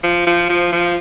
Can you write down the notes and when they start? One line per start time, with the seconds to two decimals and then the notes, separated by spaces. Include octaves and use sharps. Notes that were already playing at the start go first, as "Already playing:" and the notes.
0.04 F3
0.27 F3
0.49 F3
0.72 F3